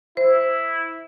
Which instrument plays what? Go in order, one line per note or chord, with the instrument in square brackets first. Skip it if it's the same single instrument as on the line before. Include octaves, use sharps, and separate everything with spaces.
[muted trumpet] E4 [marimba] C5